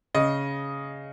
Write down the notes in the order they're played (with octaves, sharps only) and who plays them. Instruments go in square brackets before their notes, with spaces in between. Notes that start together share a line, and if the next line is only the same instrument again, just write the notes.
[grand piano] C#3 D#5